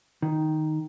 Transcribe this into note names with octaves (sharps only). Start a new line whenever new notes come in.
D#3